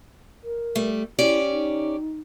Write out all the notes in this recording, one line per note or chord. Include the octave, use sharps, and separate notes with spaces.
A#4
G3 A3
C#4 E4 G4 D5
D#4